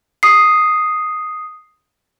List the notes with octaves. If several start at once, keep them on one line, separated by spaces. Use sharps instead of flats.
D#6 C7